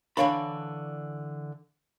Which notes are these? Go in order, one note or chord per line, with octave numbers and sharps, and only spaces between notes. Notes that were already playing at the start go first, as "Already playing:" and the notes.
D3 E3 D4 C#5 F5 B5